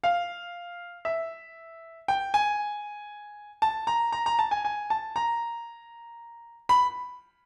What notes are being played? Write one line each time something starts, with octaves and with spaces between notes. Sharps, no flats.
F5
E5
G5
G#5
A5
A#5
A#5
A#5
A5
G#5
G#5
A5
A#5
B5